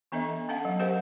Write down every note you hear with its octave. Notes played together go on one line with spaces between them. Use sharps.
E3 B3 D4 A4 D#5 E5
B3 C#4 A4 F5 F#5 A5
F#3
G4 A#4 C5 F5 F#5